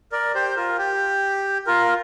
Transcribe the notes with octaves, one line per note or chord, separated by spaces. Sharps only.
A#4 D5
G4 C5
F4 A#4
G4
F4 A#4